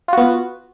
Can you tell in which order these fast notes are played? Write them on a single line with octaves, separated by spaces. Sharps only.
F4 F#4 B3